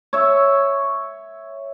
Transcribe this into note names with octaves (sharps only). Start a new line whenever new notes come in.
C#5 E5